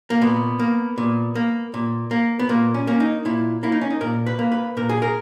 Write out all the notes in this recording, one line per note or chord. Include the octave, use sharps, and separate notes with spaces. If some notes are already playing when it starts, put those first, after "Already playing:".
A#3
A#2 B3
A#3
A#2
A#3
A#2
A#3
B3
A#2 A#3
C#4
A#3 C#4
D#4
A#2 E4
A#3 E4
D#4
C#4
D#4
A#2 A#4
B4
A#3
B4
A#2 A#4
G#4
A#4